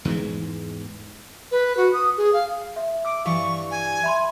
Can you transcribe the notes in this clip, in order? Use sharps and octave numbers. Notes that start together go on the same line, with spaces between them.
E2 G#2 E3 G#3
B4
F#4
D#6
G#4
F5
E5
D6 E6
G2 E3 G3 F5 C#6
G#5
E5 B5 C6